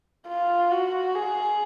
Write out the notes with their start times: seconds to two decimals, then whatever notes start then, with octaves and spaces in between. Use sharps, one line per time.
0.28 F4
0.71 F#4
1.15 G#4